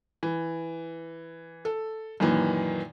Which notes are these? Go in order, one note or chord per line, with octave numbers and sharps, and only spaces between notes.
E3
A4
F#2 A#2 D#3 E3